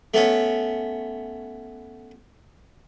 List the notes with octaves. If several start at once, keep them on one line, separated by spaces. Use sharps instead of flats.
A3 B3 C#4